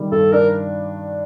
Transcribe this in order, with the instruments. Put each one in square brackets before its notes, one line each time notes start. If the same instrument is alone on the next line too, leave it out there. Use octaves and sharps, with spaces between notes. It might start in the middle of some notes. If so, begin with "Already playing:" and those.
Already playing: [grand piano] D#3 G3
[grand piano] G2 [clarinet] A4
[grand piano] D4 [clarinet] A#4